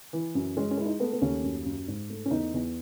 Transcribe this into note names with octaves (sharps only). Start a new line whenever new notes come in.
E3
F#2
G#3 C#4
C#4
G#3 E4
D#4
A3 B3
B3
D#2 C#4
F#2
F#2
G#2
A3
C#4
E2 D#4
E2